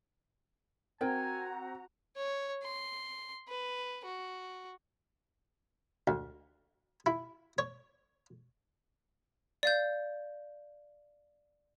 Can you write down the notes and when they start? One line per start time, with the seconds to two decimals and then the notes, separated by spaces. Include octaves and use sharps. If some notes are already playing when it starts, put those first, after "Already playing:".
1.01 C4 F#4 A#4 G5 G#5 A#5
2.16 C#5
2.63 C6
3.48 B4
4.05 F#4
6.07 D2
7.06 E4
7.58 C#5
9.63 D5 F5 G6